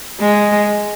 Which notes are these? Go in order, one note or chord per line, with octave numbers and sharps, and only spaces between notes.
G#3